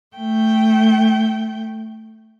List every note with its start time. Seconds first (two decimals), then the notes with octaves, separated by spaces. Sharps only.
0.16 A3 G5